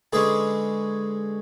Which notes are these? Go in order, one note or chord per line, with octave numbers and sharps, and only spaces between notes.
D3 G#3 C#4 G#4 B4